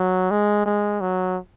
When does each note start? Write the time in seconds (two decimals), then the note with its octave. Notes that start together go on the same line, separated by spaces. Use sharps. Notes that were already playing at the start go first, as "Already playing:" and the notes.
Already playing: F#3
0.31 G#3
0.66 G#3
1.01 F#3